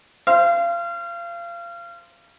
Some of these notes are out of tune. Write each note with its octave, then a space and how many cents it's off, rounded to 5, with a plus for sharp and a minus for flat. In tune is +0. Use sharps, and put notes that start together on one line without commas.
C5 +0 F5 -30